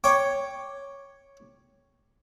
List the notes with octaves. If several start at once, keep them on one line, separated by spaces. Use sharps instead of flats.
C#5 G5 D6